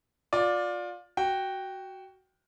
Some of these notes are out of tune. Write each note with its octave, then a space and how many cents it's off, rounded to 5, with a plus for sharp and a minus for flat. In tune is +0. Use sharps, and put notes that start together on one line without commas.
F4 +25 D5 +0
F#4 +10 G5 +0